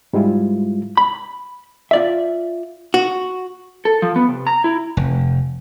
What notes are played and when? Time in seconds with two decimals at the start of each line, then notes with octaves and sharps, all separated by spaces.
0.13 G#2 G3 G#3 E4 F4
0.97 B5
1.91 F4 D5 E5
2.94 F#4
3.85 A4
4.02 F3
4.16 B3
4.29 C3
4.47 A#5
4.64 E4
4.97 F1